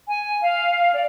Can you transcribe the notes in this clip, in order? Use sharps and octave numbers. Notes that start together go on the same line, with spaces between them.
G#5
F5
D5